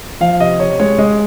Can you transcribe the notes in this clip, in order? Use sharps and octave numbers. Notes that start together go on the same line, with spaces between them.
F3 F5
C3 D#5
C3 C#5
G#3 C#5
G#3 D#5